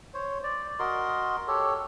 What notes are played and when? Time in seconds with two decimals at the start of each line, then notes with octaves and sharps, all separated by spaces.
0.14 C5 C#5
0.44 D5
0.79 F#4 A#4 D#5 C6
1.48 G4 A4 C#5